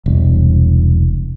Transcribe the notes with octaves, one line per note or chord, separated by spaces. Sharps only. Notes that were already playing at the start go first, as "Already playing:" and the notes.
E1 C2